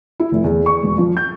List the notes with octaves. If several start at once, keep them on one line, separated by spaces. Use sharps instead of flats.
E4
F1
E2
C#6
E1
F3
G6